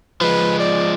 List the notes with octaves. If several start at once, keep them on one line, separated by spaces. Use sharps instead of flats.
F3 G#3 B4
D5